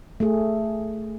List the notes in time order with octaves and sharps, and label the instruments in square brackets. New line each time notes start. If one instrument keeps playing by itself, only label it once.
[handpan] A3 G#4